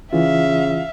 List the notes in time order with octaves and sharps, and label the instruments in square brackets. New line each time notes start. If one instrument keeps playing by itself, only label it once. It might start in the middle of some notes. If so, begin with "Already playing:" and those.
[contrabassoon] C#3 [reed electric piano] E3 F4 [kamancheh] E5 F5